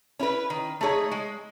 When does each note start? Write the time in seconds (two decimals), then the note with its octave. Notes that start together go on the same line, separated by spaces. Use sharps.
0.19 C#4 E4 B4
0.50 D#3
0.81 A3 D#4 G#4 C#5
1.12 G#3